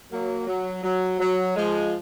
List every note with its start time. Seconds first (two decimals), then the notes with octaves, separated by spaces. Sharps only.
0.12 F#3 A#3
0.47 F#3
0.84 F#3
1.20 F#3
1.56 F3 G#3